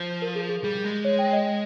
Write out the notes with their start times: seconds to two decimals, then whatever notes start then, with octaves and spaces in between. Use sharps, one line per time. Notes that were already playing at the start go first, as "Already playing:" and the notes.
Already playing: F3 C5
0.22 A#4
0.35 G#4
0.49 G#4
0.64 G3 G#4
0.84 G#3
1.05 C#5
1.19 G5
1.33 D#5